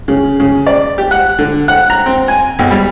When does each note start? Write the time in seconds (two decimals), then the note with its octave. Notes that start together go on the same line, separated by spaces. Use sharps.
0.08 C#3
0.40 C#3
0.67 D5
0.98 G4
1.11 F#5
1.39 D3
1.68 F#5
1.90 A#5
2.06 C4
2.28 G#5
2.59 B1
2.71 G3